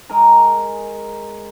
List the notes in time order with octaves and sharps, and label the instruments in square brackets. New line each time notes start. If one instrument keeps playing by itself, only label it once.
[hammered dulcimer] G#3 A#4 G#5 A#5